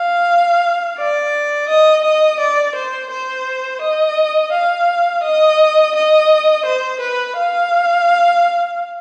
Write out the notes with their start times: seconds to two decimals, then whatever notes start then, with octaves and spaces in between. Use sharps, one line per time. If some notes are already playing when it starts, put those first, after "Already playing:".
Already playing: F5
0.98 D5
1.69 D#5
2.04 D#5
2.39 D5
2.75 C5
3.10 C5
3.81 D#5
4.52 F5
5.24 D#5
5.95 D#5
6.65 C5
7.00 B4
7.37 F5